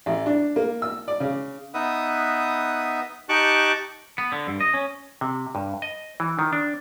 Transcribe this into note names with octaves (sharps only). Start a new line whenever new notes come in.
A1
D4
A#3
E6
D5
C#3
B3 D#4 B4 E5 D#6
D#4 G4 A5 C#6 D6 F#6
B3
D3
G2
D#5
C#4
C3
G2
D#5
E3
D#3
D4